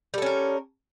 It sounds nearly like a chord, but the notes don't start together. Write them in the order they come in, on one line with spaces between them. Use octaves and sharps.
G3 A4 C#4 A#4